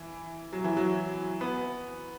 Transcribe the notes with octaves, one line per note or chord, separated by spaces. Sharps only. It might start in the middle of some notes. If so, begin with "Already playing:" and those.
Already playing: E3
F#3
E3
F#3
B3